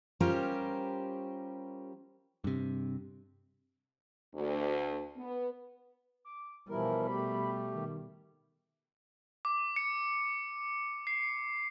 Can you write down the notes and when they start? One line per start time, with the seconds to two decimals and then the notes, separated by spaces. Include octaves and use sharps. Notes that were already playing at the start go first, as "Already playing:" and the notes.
0.20 G3 C#4 F4 G4 A#4 C5
2.44 G2 C3
4.35 D2
5.17 B3
6.25 D6
6.69 B2 E3 F3 G3 E4 A#4
7.08 A3 G4 B5
7.74 D#3
9.45 D6
9.76 C#7
11.07 C7